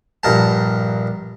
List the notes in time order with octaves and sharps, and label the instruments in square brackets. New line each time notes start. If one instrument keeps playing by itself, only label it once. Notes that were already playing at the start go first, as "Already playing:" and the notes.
[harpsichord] A#1 G2 A#4 A5